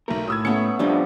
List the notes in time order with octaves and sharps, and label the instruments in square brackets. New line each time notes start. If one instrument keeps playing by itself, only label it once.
[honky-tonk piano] B1 A3 [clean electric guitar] A#4
[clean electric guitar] A2 [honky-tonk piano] D#6 E6 G#6
[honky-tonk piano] A3 C#7 [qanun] B3 C#4
[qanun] F3 G3 B3 [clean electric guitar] D4 D#4 F4